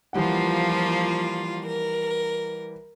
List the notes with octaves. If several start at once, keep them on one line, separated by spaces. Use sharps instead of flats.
E3 F3 G3 A#3 F4 F#5
A#4